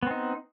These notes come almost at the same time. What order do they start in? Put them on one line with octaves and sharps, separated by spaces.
B3 C4 D#4